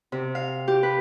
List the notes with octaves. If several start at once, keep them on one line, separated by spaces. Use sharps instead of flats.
C3
F5
G4
B4